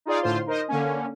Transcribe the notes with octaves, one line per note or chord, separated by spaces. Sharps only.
D#4 F4 G#4 D5 F5
A2 D3 F4 C5 C6
D#4 A#4 C5 D#5
D3 A#3 C#4